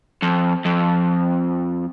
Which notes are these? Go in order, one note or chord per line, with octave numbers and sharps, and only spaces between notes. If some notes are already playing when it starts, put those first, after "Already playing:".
F2
F2